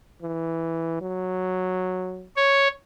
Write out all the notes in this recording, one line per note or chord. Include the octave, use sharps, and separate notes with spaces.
E3
F#3
C#5